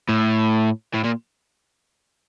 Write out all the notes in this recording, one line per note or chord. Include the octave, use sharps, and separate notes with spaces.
A2
A2
A#2